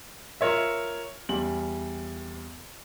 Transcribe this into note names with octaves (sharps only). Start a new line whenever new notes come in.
F4 A#4 C#5 E5
E2 G3 F#7